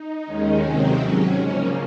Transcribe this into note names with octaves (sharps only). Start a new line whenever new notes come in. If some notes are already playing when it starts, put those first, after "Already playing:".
Already playing: D#4
D#2 D#3 G#3 C#4
F2 C3 D#3 F#3 C4
G#2 F#3 C#4
C#3 F3 A#3 C#4